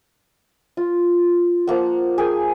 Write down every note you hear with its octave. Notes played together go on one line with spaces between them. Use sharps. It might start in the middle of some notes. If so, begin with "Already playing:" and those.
F4
F3 A#3 F#5
G#4 A#4 G5 G#5